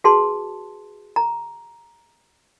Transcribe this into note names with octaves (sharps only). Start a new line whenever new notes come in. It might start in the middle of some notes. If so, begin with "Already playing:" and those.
F#4 G#4 B4 A5 C6
A#5